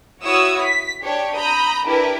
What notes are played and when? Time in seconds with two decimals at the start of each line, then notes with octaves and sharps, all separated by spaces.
0.22 E4 F#4 C#5 D#6 E6
0.62 B6
1.02 D4 G4 C#5
1.35 A#5 B5 D#6 G6
1.84 D4 E4 G4 A#4 B4